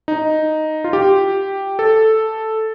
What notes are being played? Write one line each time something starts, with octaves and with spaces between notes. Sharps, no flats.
D#4
F4
G4
A4